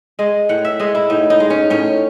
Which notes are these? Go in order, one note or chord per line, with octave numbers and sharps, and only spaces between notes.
G#3 D#5
A2 F#5
E5
G#3 D#5
E4
A2 D#4
D#4
G#3
C#4
A2 C#4